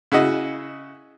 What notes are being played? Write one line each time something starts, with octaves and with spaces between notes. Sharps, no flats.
C#3 E4 F#4 D#5